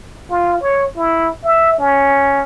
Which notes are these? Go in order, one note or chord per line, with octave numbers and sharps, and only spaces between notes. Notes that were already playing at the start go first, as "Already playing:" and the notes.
F4
C#5
E4
E5
C#4